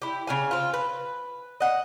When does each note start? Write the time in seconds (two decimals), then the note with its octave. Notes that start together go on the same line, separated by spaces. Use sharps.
0.02 E4 G4
0.27 C#3 F5 G#5
0.51 C4 F4
0.74 B4
1.60 D#5 F#5